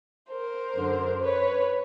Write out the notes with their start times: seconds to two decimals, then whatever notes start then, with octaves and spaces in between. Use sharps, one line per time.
0.30 A#4 C5
0.75 F#2 D3
1.22 B4 C#5